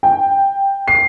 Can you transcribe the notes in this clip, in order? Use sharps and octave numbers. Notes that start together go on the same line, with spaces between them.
G5
C7